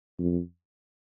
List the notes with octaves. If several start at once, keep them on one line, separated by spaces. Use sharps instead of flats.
F2